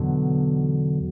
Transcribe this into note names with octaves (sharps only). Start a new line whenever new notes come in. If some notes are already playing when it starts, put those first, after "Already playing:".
Already playing: E2 B2 D3 F#3